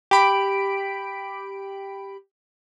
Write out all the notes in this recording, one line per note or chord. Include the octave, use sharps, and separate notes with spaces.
G4 B5 D7